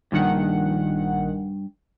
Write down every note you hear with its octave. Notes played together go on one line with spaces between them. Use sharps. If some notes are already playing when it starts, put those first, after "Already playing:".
A#1 G2 D#3 F#5